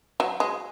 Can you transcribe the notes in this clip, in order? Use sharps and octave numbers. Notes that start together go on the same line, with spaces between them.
F#3
G#3